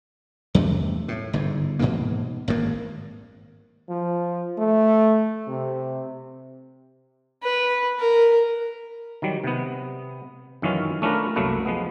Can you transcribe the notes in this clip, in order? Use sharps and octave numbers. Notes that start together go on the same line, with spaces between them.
E2 G2 C3 A3
A2
G1 G#2
G#2 B2 E3 A#3
G#1 G2 C#3 A#3
F3
A3
C3
B4
A#4
D#3 F#3 G3
C3 B3
F#2 D#3 E3 C#4 F4
A3 C#4 D4 F4 A#4 B4
C2 F#2 F#3 A3 A#3 B4
F3 G#3 B3